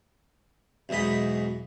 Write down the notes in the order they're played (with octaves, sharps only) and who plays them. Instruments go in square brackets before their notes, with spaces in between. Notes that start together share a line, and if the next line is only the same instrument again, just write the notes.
[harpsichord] B1 E2 G#2 D#5 B5